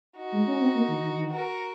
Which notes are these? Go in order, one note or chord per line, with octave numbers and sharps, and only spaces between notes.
D#4 F#4
G#3
C#4
C4
A#3
D#3
D#3
D#3
F#4 A#4